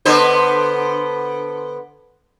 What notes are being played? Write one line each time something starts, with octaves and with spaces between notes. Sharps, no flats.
D3 B3 C5